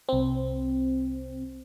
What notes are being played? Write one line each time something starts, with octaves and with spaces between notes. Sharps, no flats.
C2 C4